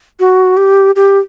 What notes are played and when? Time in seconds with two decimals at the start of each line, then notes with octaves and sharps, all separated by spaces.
0.20 F#4
0.57 G4
0.96 G4